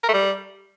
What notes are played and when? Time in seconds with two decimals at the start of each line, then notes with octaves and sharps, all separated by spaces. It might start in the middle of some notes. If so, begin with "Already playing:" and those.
0.04 A#4
0.09 A3
0.14 G3